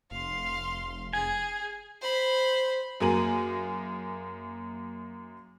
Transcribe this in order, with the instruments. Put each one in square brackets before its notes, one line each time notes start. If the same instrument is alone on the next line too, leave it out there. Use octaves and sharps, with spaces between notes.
[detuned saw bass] F1 [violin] F5 C6
[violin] G#4 [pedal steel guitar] G#5
[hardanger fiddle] C5 B5
[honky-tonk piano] F#2 A#3 G#4 A#4 D#7 F#7